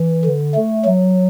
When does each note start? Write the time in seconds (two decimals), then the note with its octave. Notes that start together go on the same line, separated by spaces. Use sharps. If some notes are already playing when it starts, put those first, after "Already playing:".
Already playing: E3
0.25 D3
0.55 A3
0.85 F#3